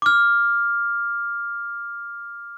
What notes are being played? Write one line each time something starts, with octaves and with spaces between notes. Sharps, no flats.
D6 F6